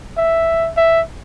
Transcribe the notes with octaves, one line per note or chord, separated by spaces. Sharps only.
E5
E5